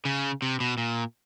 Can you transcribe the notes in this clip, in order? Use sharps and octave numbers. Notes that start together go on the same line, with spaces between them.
C#3
C3
B2
A#2